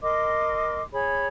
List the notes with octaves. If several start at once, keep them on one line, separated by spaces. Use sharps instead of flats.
A#4 D#5 C6 D6
G#4 C#5 B5